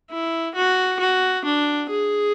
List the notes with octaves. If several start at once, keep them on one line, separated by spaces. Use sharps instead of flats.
E4
F#4
F#4
D4
G#4